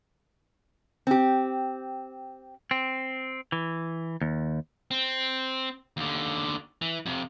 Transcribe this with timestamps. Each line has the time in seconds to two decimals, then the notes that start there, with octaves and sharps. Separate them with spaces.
1.07 C4 G4
2.71 C4
3.52 E3
4.21 D#2
4.91 C4
5.97 D#2 D3
6.82 E3
7.06 F2 C3